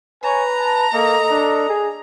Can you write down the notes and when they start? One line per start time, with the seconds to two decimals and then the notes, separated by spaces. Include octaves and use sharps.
0.24 B4 C#5 G#5 A#5
0.58 A5
0.94 A#3 A4 D#5
1.31 D4
1.69 G#4